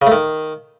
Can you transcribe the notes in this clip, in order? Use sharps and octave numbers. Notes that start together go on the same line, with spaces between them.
C#3
A3
D#3